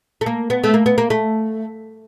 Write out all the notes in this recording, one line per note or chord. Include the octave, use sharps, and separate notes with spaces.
A3
A#3
B3
A3
A#3
B3
A#3
A3